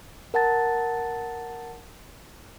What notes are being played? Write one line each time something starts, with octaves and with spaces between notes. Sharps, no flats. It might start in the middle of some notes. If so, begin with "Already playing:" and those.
A#4 F#5 A5 A6